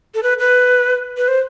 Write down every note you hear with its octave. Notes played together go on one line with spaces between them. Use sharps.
A4
B4
B4
B4
C5